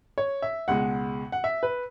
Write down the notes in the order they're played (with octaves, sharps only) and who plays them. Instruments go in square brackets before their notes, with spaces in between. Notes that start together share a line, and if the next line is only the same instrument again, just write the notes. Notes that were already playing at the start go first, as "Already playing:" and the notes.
[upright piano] C#5
E5
C#2 B2 G#3 F#5
F#5
E5
B4